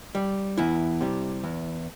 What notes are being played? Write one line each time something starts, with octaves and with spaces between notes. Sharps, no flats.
G3
E2 E4
C3 G3
E2